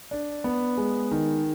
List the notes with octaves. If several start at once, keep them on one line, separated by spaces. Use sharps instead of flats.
D4
B3
G#3
D#3